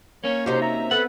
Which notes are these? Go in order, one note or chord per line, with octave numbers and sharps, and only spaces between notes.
A#3 C#4 C#5
C3 D#4 F#4 G4 C5
E5 A#5
B3 A4 B4 F#5